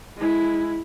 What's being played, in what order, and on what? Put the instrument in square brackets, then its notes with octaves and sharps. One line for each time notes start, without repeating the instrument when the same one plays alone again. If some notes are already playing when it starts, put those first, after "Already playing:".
[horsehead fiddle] G#3 E4